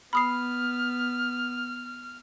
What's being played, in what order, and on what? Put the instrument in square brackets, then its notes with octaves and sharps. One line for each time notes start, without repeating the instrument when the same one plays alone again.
[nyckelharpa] B3 [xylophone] B5 D#6 C7 [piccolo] F6